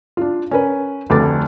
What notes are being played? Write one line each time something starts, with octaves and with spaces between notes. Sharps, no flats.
D4 F4
C#4 A#4 B4
F1 D2 A3 B4 D6 A6